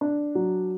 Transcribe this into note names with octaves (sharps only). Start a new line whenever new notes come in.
D4
F#3